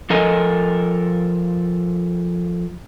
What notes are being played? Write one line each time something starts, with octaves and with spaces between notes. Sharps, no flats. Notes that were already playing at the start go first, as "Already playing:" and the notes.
F3 A4 A#4 D#5 G#5